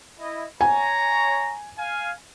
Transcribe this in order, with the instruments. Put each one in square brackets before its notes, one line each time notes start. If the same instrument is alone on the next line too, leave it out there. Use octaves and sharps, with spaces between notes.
[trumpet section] E4 D#5
[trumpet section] C#5 A#5 [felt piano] G#5
[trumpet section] F5 G#5